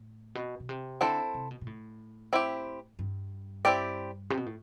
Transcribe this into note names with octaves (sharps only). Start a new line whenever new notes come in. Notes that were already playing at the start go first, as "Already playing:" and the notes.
Already playing: A2
B2
B2
C3
D3 C4 E4 A4 C5
C3
B2
B2
A2
C4 E4 G4
G2
C4 E4 G4 D5
C3
B2
A2